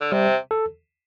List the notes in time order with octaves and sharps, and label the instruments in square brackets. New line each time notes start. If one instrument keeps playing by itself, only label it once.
[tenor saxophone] D3
[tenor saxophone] C3 [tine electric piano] G3
[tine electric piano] A4